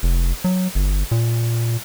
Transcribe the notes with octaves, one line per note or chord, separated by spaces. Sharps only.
F1
F#3
G1
A#2